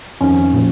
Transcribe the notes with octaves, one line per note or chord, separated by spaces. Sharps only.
F2 D#3 C#4
A#2 F3